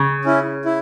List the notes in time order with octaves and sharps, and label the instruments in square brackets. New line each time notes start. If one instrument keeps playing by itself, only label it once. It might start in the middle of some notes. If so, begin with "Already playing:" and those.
Already playing: [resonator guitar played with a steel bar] C#3
[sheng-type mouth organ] C#4 E4
E4